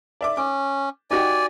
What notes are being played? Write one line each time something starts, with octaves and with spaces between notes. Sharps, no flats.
D5 E5 D6
C#4 D6
D#4 F#4 G4 D5 G#5